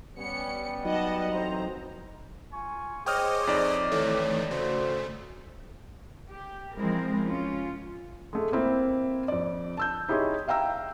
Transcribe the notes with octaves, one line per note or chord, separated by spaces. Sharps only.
G3 B3 C#4 C#7
F#3 D#4 D#5 F#5 A5
A1 C4 C5 A#5
F4 G#5 C#6
G#4 C5 C#5 D#5 G5 D6 D#6 F6
F2 D#4 D5
D#3 E3 A3 C#5
C#3 A3 F#4 C5
G4
F3 G#3 C4 E4 A#4
C#4 F4
G#3 A3
A#3 C4 E4
F2 D5
A5 E6 G6
D#4 E4 G4 G#4 C#5 C6
E5 F5 G5 A#5 E6